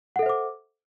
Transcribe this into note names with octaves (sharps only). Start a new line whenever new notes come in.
A4 C5 E5 F#5 D6